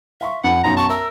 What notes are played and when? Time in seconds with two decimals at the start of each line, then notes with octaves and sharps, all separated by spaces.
0.21 E5 F5 C6 C#6
0.44 F2 F#5 B5
0.64 B1 F#2 D#4 A#5 C6
0.77 A5 C#6
0.89 A#4 E5 E6